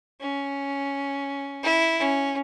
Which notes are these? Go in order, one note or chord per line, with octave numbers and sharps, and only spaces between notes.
C#4
E4
C#4